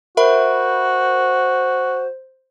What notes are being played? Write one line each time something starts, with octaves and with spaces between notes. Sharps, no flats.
F#4 A#4 C5 E5 B5